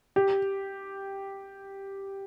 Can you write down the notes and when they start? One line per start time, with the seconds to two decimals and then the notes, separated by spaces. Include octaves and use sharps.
0.16 G4